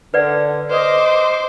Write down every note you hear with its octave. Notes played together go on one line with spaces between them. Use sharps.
D3 B4 D5 F#5
B4 C5 D#5 D6